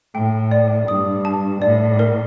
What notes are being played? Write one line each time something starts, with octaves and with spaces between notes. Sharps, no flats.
A2 G5
D5
G2 D#6
A5
A2 D5
A#4